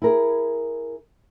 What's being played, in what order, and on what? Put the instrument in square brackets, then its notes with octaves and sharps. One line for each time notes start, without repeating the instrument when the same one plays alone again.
[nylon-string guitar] E4 G#4 A#4